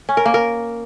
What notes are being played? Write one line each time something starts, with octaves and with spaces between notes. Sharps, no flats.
C#4
A#4
A#3
A#4